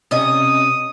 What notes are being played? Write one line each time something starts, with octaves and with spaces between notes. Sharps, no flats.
C3 C#4 D#5 D#6